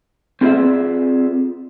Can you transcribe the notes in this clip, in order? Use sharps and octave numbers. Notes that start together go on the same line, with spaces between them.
C4 F4 G#4 A4 D5 E5